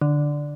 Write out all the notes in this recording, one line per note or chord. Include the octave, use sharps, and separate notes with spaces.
D3